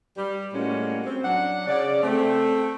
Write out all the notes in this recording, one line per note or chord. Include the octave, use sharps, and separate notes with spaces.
G3
A2 G3 G#3 A#3 C#4 F#4
C4
F#3 D4 F#5
C#3 D5
A3 C4